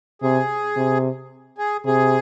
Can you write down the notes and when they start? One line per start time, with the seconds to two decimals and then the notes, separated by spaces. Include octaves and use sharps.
0.22 C3 G#4
0.77 C3
1.58 G#4
1.85 C3 G#4